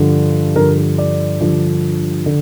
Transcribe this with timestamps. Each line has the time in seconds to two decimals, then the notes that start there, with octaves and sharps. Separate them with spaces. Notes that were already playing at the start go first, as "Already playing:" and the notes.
Already playing: G2 D3 F3
0.56 G2 D3 F3 A#4
0.98 D5
1.41 G2 D3 F3
2.26 D3